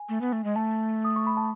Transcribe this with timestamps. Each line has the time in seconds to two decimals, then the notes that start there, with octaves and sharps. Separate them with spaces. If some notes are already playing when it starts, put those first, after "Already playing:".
Already playing: G#5
0.09 A3
0.21 B3
0.32 A3
0.44 G#3
0.56 A3 A5
1.05 D#6
1.16 C#6
1.27 B5
1.37 A5